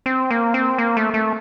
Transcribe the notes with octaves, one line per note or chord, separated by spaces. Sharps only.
C4
A#3
C4
A#3
A3
A3